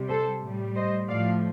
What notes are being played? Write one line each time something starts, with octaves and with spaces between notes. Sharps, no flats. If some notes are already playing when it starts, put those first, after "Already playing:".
Already playing: C3 G3
A4 C5
A2 G3
C5 D#5
A2 F3 D5 F5